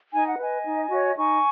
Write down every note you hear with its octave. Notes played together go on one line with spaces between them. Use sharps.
D#4 G#5
F#5
B4 D#5 G#5
D#4
F#4 C#5
D#4 G#5 C#6